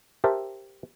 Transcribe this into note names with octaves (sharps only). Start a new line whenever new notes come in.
G4 A#4 C5 E5 G5 A5